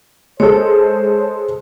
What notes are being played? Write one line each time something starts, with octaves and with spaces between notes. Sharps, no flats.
G#3 A4 C5 C#5